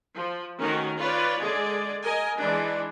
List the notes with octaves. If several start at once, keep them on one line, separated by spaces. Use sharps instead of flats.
F3
D#3 A3 C#4 F#4 A#4
F4 B4 C#5 D5
D3 G#3 G#4 D5
A#4 D#5 G#5
E3 G#3 D4